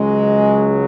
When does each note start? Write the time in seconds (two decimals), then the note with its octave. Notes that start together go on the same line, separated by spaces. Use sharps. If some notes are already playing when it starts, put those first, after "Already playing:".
Already playing: C#2 C#3 F#3 G#3